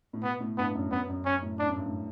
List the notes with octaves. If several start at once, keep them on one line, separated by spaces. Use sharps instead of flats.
A2
B2 B3
A2
G2 B3
F#2
F#2 B3
F#2
C#4
A2
A2 D4
F#2
G2
A2